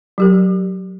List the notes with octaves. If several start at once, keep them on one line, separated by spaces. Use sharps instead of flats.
F#3 G4 A#4